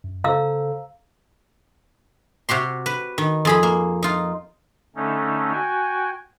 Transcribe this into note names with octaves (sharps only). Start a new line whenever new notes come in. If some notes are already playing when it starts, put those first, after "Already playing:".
F#2
C#3 A4 C5 F5 A#5 E6
C3 F#4 G4 C6
B4
D#3
F2 G#4 B5
A#3
D#4 F4
D3 A3 C#4 D#4
F#4 G5 G#5